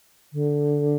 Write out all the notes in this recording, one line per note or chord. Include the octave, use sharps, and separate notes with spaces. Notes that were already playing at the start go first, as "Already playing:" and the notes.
D3